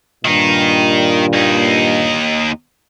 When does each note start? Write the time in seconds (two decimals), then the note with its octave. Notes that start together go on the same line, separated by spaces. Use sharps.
0.25 G2 A#2 D#3 D#4
1.34 D#2 D#4